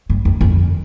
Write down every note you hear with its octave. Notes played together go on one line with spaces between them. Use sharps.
G2
F2
F2